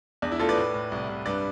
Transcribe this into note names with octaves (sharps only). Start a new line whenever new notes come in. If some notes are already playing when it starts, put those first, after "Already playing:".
E2 D4
E4
A3 F4 A4
B4 D5
A2
A2
C2
C2
G2 B4 D5